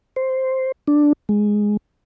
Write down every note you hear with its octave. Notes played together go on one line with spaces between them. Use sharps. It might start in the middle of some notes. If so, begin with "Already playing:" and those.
C5
D4
G#3